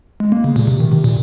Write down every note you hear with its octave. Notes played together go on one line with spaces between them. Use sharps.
G#3
A#3
C#3
A#2
C3
D#3
C3
A#2